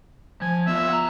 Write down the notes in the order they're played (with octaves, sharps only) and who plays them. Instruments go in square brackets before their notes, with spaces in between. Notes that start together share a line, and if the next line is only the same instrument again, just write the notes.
[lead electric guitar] F3 [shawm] G#5
[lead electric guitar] B3 F4 [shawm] E5
[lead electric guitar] F#5 A#5